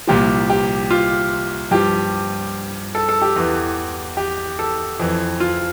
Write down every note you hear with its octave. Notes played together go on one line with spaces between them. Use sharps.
C2 A#2 F3 G4
G4
F4
G2 F3 G4
A4
A4
G4
E2 E3
G4
A4
F2 E3
F4